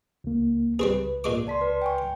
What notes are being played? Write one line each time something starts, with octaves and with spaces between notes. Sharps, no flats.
C#2 A#3
C#2 G3 C4 G#4 B4
A#2 G#3 D6
C#2 D5 A5 C6 B6
B4
G5 G#5 C#6